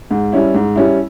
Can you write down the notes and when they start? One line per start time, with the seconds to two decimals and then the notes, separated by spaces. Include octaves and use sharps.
0.11 G#2
0.33 G3 C#4 E4
0.54 G#2
0.76 G3 C#4 E4